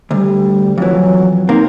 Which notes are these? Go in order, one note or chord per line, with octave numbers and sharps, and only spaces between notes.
D2 G3
F2 E3 F#3
C3 A#3 D#4